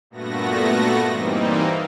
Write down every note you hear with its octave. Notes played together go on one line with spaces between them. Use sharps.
G2 A#2 A3 B3 F#4 A#6
E3 G3 A#3 C4 D#4